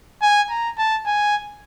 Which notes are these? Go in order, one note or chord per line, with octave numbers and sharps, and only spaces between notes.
G#5
A#5
A5
G#5